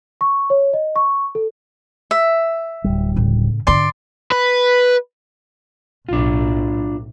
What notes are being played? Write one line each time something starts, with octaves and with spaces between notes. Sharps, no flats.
C#6
C#5
D#5
C#6
A4
E5
D1 C#2 G3
A2 C#3
G#2 D3 D5 C6
B4
B1 A2 D4 F4